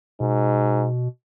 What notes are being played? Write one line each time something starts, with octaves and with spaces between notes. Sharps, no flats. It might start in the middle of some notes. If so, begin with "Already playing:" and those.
G#2 B2